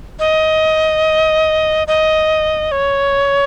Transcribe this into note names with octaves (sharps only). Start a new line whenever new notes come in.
D#5
D#5
C#5